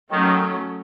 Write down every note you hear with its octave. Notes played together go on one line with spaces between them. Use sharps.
D#3 F#3 A3 C#4